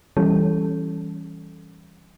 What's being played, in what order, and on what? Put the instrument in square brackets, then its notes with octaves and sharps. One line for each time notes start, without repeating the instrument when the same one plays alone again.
[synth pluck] E3 G3 C#4 A4